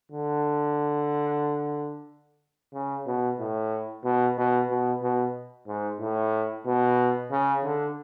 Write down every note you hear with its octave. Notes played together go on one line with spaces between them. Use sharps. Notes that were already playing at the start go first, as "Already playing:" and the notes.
D3
C#3
B2
A2
B2
B2
B2
B2
G#2
A2
B2
C#3
D3